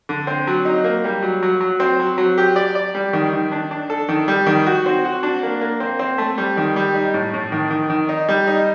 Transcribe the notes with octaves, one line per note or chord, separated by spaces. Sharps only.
D3
C4
F#3
D#4
A#3
G3
F#3
F#3
F#3
C4
F#3
F#3
G4
D5
D5
G3
D#3
D#3
D4
D4
A4
D#3
G3
D#3
F#4
C4
F#4
D4
A#3
A#3
C4
C4
A3
G3
D#3
G3
D#4
A2
A2
D#3
D#3
D#3
D#4
G3
D#4